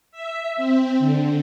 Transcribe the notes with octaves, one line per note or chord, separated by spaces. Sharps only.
E5
C4
D3